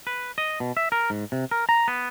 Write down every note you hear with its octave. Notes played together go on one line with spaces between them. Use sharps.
B4
D#5
B2
E5
A#4
G#2
C3
A#4
A#5
B3